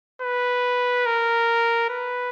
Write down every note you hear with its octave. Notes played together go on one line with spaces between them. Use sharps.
B4
A#4
B4